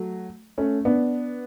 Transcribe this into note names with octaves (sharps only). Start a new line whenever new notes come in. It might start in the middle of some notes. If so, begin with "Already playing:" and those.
Already playing: F#3 A3
A3 C#4
B3 D4